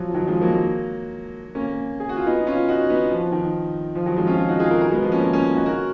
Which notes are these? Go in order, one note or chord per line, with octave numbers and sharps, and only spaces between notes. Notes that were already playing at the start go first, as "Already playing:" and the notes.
Already playing: F3 F#3
D#3 F#3
F3 G#3
F#3 A#3
A#3 C#4
G#4
F#4
F4
B3 D#4
C#4 F4
D#4 F#4
B3 D#4
F3
D#3
F3
D#3 F#3
F3 G#3
C#4 F4
C#4 F4
D#4 F#4
F4 G#4
F#4 A#4
F#4 A#4
G#3 B3
F3
A#3 C#4
A#3 C#4
A#3 C#4
D#4 F#4
F#4 A#4